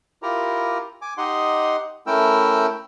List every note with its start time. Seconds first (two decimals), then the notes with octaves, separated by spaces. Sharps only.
0.22 E4 F4 G4 A#4 A#5
1.02 G#5 D6
1.18 D#4 G4 D#5 F#5 C6
2.07 A3 C#4 E4 A#4 G5 E6